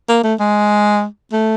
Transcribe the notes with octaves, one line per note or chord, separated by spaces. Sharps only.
A#3
A3
G#3
A3